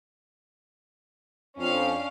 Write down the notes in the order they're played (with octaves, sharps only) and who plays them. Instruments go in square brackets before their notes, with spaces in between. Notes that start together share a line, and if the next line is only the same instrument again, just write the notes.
[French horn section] F2 [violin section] C#4 D4 F5